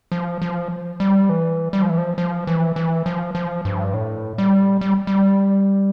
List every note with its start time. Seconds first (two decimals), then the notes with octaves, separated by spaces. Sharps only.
0.12 F3
0.42 F3
1.00 G3
1.29 E3
1.73 G3
1.82 F3
1.89 E3
1.98 F3
2.18 F3
2.47 E3
2.76 E3
3.06 F3
3.35 F3
3.65 G2
3.93 A2
4.38 G3
4.81 G3
5.07 G3